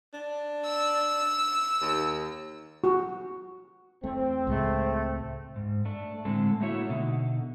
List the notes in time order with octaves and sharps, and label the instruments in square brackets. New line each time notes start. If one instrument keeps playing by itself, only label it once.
[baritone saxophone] D4
[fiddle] E6
[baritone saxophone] D#2
[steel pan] F#4
[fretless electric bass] E2 A3 [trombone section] C4
[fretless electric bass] C#2 A2 G#3 [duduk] A3
[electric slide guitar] G#2
A3 D4
A2 D3 G#3 C4 A4
A3 A#3 E4 F#4 C#5 E5
B2 D3 D#4